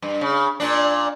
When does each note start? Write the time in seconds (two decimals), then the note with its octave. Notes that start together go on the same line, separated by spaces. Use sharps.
0.02 G2
0.21 C#3
0.60 A#2 D4